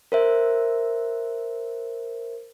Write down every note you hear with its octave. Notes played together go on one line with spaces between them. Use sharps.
A#4 C5 E5